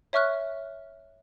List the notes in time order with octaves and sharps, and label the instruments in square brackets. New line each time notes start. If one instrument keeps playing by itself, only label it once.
[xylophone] C#5 E5 C#6 F6 F#6